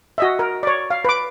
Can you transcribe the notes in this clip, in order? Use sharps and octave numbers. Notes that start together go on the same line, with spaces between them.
F#4 D#5 E5
A#4
C#5 D5
F5
B4 D6